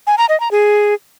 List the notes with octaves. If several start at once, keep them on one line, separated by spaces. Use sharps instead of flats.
G#5
A#5
D#5
A#5
G#4